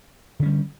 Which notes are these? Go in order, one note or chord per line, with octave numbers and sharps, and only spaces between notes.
D3 G3 C#4